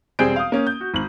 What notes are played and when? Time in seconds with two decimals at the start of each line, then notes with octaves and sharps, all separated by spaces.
0.19 E1 G3 C4 G#4 G6 D7
0.36 F5 D#6
0.52 A#3 C#4
0.67 G6
0.81 F#4
0.94 G#1 F#7